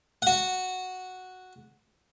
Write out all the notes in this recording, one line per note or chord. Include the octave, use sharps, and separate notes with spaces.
F#4 F#5